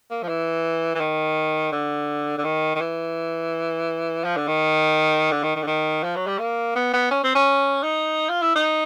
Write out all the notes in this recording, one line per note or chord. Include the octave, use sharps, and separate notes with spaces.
A#3
F3
E3
E3
D#3
D3
D3
D#3
D#3
E3
F3
D3
D#3
D3
D#3
D#3
D3
D#3
F3
F#3
G3
A#3
B3
B3
C#4
C4
C#4
D#4
F4
E4
D#4